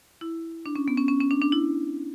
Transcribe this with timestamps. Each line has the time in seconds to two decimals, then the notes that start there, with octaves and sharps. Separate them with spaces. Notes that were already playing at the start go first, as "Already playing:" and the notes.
0.21 E4
0.66 D4
0.76 C#4
0.88 B3
0.97 C#4
1.08 C#4
1.20 C#4
1.31 D4
1.42 D4
1.52 E4